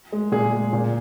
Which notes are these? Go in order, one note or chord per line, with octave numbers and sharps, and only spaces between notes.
G#3
A#2 G#4
G#3
A#2